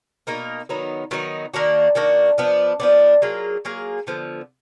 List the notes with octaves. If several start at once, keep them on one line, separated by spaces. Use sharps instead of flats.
B2 A#3 D#4 A#4
D#3 F#3 B3 D#4
D#3 F#3 B3 D#4
D#3 A#3 D4 F#4
D#3 A#3 D4 F#4
F3 B3 D4
F3 B3 D4
F#3 A#3 F4 G#4
F#3 A#3 F4 G#4
D3 F3 B3